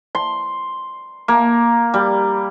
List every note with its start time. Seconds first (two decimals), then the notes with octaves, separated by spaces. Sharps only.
0.15 C6
1.28 A#3
1.94 G3